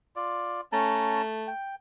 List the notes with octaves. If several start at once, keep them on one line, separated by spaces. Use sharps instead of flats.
F4 D5
A3 C#4 A5 A#5
G5